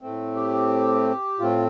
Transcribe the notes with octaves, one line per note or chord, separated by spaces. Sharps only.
A2 A3 C4
G4
A2 A3 C4 F4